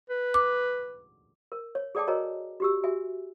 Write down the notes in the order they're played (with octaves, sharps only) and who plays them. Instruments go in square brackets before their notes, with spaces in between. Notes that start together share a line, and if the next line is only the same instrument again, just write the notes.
[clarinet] B4
[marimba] D6
[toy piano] A#4
C#5
G#4 A4 D5 G5 A5 D6
F#4 A#4 C#5 D#5 G#5 A#5
F#4 G4 E6
F#4 E5 G#5